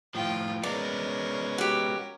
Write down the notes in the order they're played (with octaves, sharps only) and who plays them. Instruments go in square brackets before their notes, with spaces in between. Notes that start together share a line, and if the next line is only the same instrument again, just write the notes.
[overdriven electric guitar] A2 F3 [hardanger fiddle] F4 G5
[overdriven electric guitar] G#3 B3 [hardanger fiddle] C#4 A#4 [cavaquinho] D5
[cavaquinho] F#4 G4